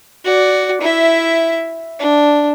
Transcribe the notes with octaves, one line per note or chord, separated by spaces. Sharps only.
F#4 D5
E4 E5
D4